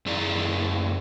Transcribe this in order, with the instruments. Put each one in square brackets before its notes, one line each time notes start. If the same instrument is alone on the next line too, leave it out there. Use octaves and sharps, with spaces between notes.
[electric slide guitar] F#2 E4 G#4 D5 A#5